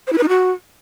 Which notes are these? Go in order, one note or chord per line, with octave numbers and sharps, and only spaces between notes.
C5
E4
B4
D#4
F#4